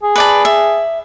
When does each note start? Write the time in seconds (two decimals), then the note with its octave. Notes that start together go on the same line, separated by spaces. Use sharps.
0.03 G#4
0.16 B4 D5 A5
0.45 E5